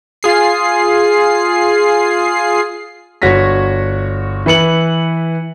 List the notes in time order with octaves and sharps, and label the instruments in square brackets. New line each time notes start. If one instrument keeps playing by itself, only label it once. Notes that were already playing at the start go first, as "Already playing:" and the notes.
[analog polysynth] F4 G#4 C7
[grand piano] G1 F#4 C#5 A#6 B6
E3 B4 C#7 F#7